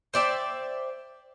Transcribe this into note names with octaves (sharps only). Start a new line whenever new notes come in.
C5 D5 E5 G5